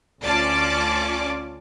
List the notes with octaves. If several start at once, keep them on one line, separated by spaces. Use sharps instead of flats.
D2 C#4 F4 D5 A5 D6